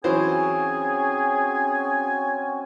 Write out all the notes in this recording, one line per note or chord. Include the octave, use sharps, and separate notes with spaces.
E3 F#3 C4 C#4 F#4 G#4 C5 G#5